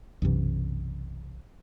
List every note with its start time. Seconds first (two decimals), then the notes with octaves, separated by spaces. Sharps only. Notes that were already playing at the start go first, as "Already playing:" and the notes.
0.22 B1 F#2 C3 E3